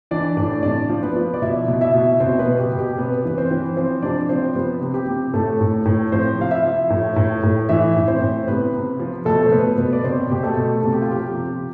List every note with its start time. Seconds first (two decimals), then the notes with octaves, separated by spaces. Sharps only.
0.11 E3 D4 D5
0.37 A2 D4 D5
0.63 C3 D4 D5
0.89 F3
1.02 B3 B4
1.16 F3
1.34 D5
1.42 B2 E4 E5
1.68 B2
1.81 E4 E5
1.94 B2
2.20 B2 C4 C5
2.39 B3 B4
2.46 B2
2.59 G4
2.72 B2
2.79 G4
2.98 C3 B3 B4
3.25 E3 B4
3.38 C4 C5
3.51 E3
3.77 F3 C4 C5
4.03 C3 D4 D5
4.29 F3 C4 C5
4.55 C3 B3 B4
4.82 C3
4.94 G4
5.07 C3
5.34 A2 A3 A4
5.61 A2
5.85 A2
6.12 F3 C4 C5
6.38 C3 F5
6.51 E4 E5
6.65 F3
6.90 A2
7.16 A2
7.43 A2
7.69 E3 E4 E5
7.96 A2
8.08 C4 C5
8.21 A2
8.47 C3 B3 B4
8.73 C3
9.00 F3
9.25 B2 A3 A4
9.46 C5
9.52 B2 B3 B4
9.78 B2 B3 B4
9.93 D5
10.04 B2 C4 C5
10.30 B2 G4
10.43 A3 A4
10.57 B2
10.82 C3 A4
10.93 G4
11.02 F4
11.09 F3 G4
11.34 C3